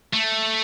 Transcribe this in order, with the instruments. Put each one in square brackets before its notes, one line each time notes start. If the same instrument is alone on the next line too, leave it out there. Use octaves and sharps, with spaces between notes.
[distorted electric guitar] A3